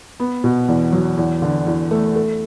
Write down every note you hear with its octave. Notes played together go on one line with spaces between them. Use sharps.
B3
B2
E2
F#3
E2
D3
E2
A3
A4